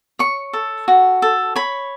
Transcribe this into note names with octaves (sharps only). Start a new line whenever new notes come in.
C#5 C#6
A4
F#4
A4
C#5 B5